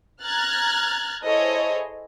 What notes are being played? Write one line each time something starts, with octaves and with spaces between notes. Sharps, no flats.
A#5 F6 F#6 G#6 A6
E4 G#4 A4 C5 C#5 D#5